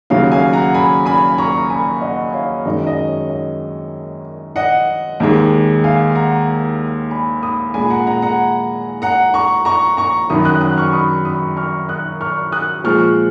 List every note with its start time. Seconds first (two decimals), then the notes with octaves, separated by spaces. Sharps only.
0.10 D#2 C#3 F#3 C#5 F5
0.31 F5 G#5
0.53 F#5 A#5
0.74 G#5 B5
1.06 G#5 B5
1.38 A#5 C#6
1.70 G#5 B5
2.01 D#5 F#5
2.33 C#5 F5
2.65 F#2 D#3 G#3 D#5
2.87 D#5
3.08 C#5
3.29 D#5
4.56 D#5 F#5
5.20 D#2 D#3 G#3
5.84 F5 G#5
6.15 F#5 A#5
7.11 G#5 B5
7.43 B5 D#6
7.74 A#2 G#3 G#5 B5
7.90 F#5 A#5
8.07 F#5 A#5
8.22 F#5 A#5
9.02 F#5 A#5
9.34 A#5 C#6
9.65 A#5 C#6
9.97 A#5 C#6
10.30 F#2 D#3 F#3 B5 D#6
10.45 D#6 F#6
10.61 D#6 F#6
10.77 C#6 F6
10.93 B5 D#6
11.25 B5 D#6
11.57 C#6 F6
11.89 D#6 F#6
12.21 C#6 F6
12.52 D#6 F#6
12.84 A#2 F3 G#3 C#6 F6